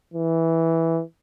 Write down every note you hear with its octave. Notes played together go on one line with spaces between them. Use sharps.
E3